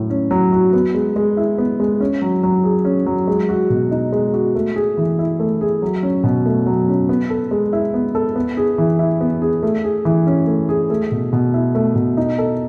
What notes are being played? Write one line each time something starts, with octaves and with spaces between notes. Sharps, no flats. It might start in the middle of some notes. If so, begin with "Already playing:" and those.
Already playing: A2 F#3 F#4
C#4
F#3
F#4
B3
G#3
G#3
E4
B3
G#3
C#4
F#3
F#3
G#4
C#4
F#3
G#3
F#4
B2
D#4
G#3
F#4
A3
G#4
E3
E4
A3
G#4
F#3
C#4
B2
A3
F#3
C#4
B3
A4
G#3
E4
B3
A4
B3
G#4
E3
E4
B3
G#4
A3
G#4
E3
C#4
A3
G#4
A3
B2
B2
E4
A3
B2
D#4
A4